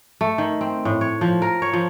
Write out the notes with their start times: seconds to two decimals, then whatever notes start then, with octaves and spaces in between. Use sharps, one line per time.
0.21 A3
0.38 D#3
0.61 C4
0.85 A2
1.01 C#5
1.21 F3
1.42 A#4
1.62 C#5
1.73 F3